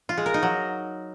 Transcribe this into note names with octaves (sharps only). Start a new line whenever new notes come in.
F4
G#3
A#4
D#4
F#3